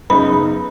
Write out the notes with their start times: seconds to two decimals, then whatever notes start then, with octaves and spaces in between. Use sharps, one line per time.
0.10 F#2 C#3 B3 D#4 B5